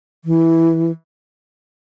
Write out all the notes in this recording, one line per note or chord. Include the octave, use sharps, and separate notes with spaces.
E3